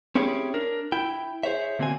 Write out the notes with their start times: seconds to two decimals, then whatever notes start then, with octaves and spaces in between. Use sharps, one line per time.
0.15 C4 C#4 E4 G4 G#4 C#5
0.54 D4 A#4
0.92 E4 G5
1.43 G#4 C5 C#5 E5
1.79 D3 A#3 C4 F#4 G#5